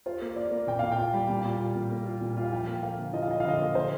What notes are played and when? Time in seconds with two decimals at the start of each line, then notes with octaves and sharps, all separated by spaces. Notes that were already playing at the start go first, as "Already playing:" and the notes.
0.06 F4 C5
0.22 A#3
0.36 F4 D5
0.51 A#3
0.67 A#2 G5
0.79 A#2 F5
0.92 G5
0.98 F4
1.14 G3
1.29 A#2
1.45 F4
1.60 F4
1.76 A#2
1.91 A#3
2.05 F4
2.21 A#2
2.37 F4
2.42 F5
2.52 F3 G5
2.67 A#3
2.83 A#3 F5
2.98 D3
3.13 F3 D#5
3.23 F5
3.29 F3 D#5
3.40 F5
3.45 D3 D#5
3.60 A#3
3.75 D3 C5